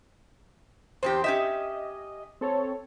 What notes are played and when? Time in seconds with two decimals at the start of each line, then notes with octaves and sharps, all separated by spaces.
1.03 E2 C4 G4 C5
1.24 C#4 G4 D#5 E5
2.41 C4 A4 C#5